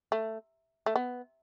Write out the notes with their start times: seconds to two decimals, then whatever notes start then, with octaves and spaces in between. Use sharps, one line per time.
0.12 A3
0.86 A3
0.96 B3